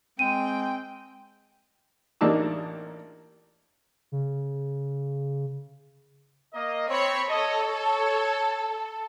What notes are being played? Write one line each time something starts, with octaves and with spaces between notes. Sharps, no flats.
G#3 C4 G5 D#7
A1 A#3 D4 D#4 A5 E6
C#3
A#3 A#4 D#5
C4 C#5 B5 C#6
A4 C#5 D#5
C#5